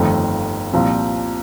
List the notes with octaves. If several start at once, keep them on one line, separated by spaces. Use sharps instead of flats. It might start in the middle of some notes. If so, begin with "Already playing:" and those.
Already playing: G1 F2 D#3 A3
C2 A#2 F3 C4